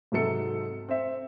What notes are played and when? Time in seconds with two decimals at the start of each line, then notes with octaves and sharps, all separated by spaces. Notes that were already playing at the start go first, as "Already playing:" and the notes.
0.12 G#2 C3 F#3 A4 C#7
0.89 C4 E5